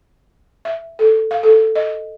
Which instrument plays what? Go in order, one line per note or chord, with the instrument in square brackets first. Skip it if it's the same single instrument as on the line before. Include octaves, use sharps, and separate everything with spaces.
[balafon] E5
A4
F5
A4
D#5